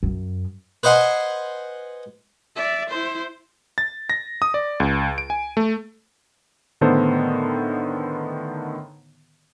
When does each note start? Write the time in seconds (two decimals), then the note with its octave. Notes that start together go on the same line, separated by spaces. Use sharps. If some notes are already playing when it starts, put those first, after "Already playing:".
0.03 F#2
0.83 B4 C5 D#5 F#5 G#5 C6
2.56 D5 E5
2.89 E4 C5
3.78 A6
4.10 A#6
4.42 D#6
4.54 D5
4.80 C#2
5.18 D7
5.30 G#5
5.57 A3
6.81 A2 D3 D#3 B3 A4 C5